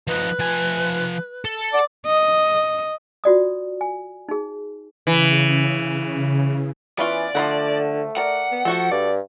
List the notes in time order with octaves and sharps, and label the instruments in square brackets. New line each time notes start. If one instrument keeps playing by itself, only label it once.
[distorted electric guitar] F3 D#4 [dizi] B4
[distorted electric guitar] F3 G#5
A4
[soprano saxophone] D5 [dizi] F#5
[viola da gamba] D#5
[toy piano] F4 F#4 D5 D#6
G#5
D#4 G#4
[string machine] C#3 [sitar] E3
[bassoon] E3 [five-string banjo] B3 C#4 F4 [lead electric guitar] D5
[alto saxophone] D3 [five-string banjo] F3 E4 F#5 [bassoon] A3
[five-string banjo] A#4 D5 [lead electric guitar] F#5
[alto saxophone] B3
[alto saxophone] F3 [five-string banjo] A3 F#4 A4
[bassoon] G2 [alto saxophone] D5